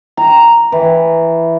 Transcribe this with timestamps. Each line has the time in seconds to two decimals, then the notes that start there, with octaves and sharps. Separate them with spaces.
0.17 A#5
0.72 E3